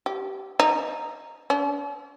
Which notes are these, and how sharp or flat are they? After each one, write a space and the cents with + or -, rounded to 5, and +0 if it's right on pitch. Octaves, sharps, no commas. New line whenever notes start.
G4 -20
D#4 -10
D4 -45